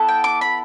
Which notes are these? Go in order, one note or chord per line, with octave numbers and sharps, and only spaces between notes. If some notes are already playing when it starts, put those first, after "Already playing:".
Already playing: B3 E4 A4
G5
D6
B5